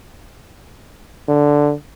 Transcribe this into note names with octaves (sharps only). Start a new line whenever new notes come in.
D3